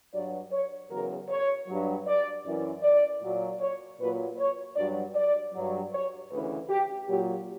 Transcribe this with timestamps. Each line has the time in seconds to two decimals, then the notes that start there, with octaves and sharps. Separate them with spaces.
0.13 G2 F#3 D5
0.52 C#5
0.90 E2 C#3 F#3 A#4
1.29 C#5
1.68 G2 F#3
2.06 D5
2.45 F#2 E3
2.83 D5
3.22 A#2 F#3
3.61 C#5
3.99 A#2 F#3 B4
4.38 C#5
4.76 G2 F#3 D5
5.15 D5
5.54 G2 F#3
5.93 C#5
6.31 D2 C#3 E3 B4
6.70 G4
7.09 A#2 F#3 G4